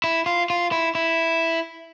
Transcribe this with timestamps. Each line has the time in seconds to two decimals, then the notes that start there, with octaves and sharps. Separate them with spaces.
0.04 E4
0.26 F4
0.50 F4
0.72 E4
0.95 E4